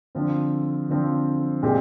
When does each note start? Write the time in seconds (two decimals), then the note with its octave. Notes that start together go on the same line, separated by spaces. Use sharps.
0.15 D3 F3 C4
0.89 D3 F3 C4
1.63 A#2 G#3 C4 G4